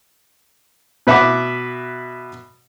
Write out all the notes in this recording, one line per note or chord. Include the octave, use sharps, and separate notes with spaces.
B2 B4 E5 F#5 D6